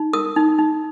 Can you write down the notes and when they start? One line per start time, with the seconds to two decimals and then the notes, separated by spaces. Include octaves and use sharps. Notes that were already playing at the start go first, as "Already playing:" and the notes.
Already playing: D#4
0.13 A#4 D#6
0.36 D#4
0.59 D#4